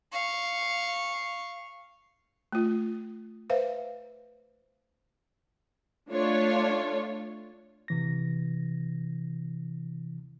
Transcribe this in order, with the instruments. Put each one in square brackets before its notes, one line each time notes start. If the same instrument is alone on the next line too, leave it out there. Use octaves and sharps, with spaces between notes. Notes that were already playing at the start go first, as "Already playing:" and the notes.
[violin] F5 C#6
[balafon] A3 F4
B4 C5 E5 F5
[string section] A3 D4 F4 C#5
[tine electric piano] C3 E3 A#6